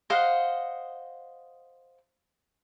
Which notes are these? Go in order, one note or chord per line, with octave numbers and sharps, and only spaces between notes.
C5 D#5 F5 F#5